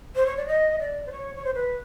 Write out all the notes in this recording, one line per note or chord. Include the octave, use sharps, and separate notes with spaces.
C5
C#5
D5
D#5
D5
C5
C#5
C#5
C5
B4